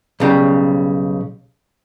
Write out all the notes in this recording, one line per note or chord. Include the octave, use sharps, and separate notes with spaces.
B1 C#3 G3